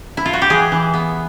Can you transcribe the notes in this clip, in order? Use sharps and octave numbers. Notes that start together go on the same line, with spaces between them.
E4
F4
F#4
G4
E3 G#4
E3
B3